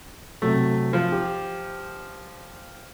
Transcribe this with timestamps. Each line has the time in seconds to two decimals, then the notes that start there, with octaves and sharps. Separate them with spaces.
0.42 C3 F#3 A3
0.93 F3
1.12 G4